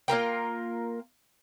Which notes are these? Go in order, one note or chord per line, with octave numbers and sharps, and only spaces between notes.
A#3 F4 A#4 G5